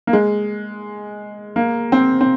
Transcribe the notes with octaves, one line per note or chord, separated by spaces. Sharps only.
A#3
G#3
A#3
C4
C4